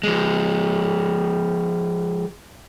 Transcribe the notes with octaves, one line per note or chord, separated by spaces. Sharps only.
F3 G#3